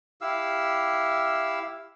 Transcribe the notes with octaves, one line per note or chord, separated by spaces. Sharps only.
E4 G4 F5 E6